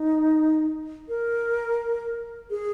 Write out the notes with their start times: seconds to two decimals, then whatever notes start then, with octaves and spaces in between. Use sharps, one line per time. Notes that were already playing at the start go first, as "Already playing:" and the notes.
Already playing: D#4
1.09 A#4
2.50 G#4